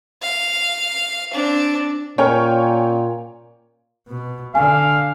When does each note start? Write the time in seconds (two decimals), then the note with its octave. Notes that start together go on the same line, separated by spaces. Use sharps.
0.22 F5
1.32 C4 D4
2.18 A#2 C#4 A#4 C#5 G5 G#5
4.07 B2
4.55 D3 F5 G#5